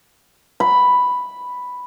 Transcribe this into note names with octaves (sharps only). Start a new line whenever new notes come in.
B5